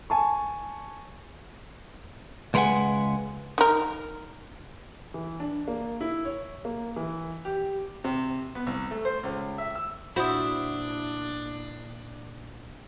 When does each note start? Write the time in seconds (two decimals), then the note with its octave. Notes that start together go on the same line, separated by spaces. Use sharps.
0.10 G#5 A5 C#6
2.54 C#2 G#3 A#4 B4 F#5 G#5
3.58 D#3 A#4
5.14 E3
5.40 D4
5.68 A#3
6.01 E4
6.25 C#5
6.65 A#3
6.96 E3
7.45 G4
8.04 C3
8.55 B3
8.67 C2
8.91 A3
9.05 C5
9.23 C#2
9.58 E5
9.75 E6
10.16 A#2 D4 E4 F#4 C5 B5 D#6